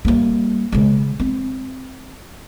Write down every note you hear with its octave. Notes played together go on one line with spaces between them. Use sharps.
G3 A#3
C#3 G#3
C4